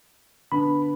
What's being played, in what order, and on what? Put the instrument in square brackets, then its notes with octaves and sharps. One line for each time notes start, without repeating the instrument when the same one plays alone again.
[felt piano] D3 B3 D4 [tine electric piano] B5